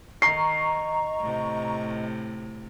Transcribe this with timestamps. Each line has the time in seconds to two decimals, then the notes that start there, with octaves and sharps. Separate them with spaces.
0.22 D#3 D#5 A#5 C#6 C7
1.19 A2 C3